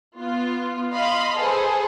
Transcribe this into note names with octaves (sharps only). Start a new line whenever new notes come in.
B3 F4
D#5 F5 B5 C6
G#4 A4 B4 C5